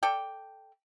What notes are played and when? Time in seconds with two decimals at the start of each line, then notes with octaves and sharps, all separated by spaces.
0.03 A4 D5 G5